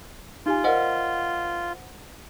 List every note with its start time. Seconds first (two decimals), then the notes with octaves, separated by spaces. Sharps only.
0.46 D#4 F4 G4 G#5
0.64 A#4 C5 D5 D#5 F#5